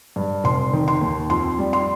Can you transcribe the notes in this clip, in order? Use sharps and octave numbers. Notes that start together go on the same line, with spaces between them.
G2
F1 C6
D#3
C6
D#2
F2 C6
G3
C6